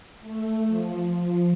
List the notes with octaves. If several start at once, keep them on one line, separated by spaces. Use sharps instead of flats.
A3
F3
F3